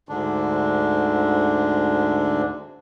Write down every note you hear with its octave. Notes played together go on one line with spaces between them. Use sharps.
D2 G#2 D3 D4